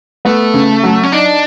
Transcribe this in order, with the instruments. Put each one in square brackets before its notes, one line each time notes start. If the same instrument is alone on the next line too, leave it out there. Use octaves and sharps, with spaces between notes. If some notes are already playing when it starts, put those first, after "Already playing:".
[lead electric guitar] A3 [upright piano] B3
[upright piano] C#3
F#3
[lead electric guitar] C#4
[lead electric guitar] D4 [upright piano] D#4